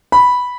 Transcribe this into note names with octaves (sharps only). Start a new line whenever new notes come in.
B5